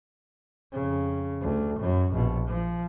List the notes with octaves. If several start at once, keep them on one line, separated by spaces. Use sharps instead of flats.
F2 C#3
D2
F#2 F#3
A#1 B2
F3